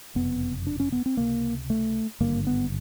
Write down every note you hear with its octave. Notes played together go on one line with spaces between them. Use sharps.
F#1 F2 C3 B3
D4
C#4
B3
C4
C#2 C3 A#3
A3
G#1 G2 D3 A#3
B3